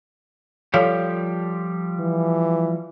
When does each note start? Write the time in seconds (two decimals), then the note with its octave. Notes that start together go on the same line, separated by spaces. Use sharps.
0.74 F3 G3 G4 A4 C#5 F5
2.00 E3